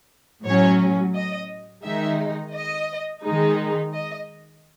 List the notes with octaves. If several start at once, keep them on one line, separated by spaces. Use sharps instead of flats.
A2 F#3 C#4 C#5
D#5
D#3 G#3 D#4 E5
D#5
D#3 G#3 D#4
D#5